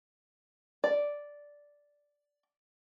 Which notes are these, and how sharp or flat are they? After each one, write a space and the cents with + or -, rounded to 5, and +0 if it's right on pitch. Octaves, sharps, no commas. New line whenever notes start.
D5 -5